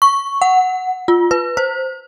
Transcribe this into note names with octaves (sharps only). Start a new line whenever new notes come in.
C#6
F#5
F4
B4
C5